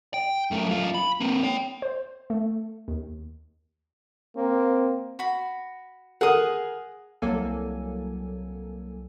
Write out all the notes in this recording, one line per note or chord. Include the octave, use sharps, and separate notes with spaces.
G5
F#2 A3
F#2 F4
B5
A#3 C4
C#5 G5
C5
A3
D#2
A#3 C4
F#4 B5
G#4 A#4 F#5 D#6
C2 F#3 A#3 A4 G#5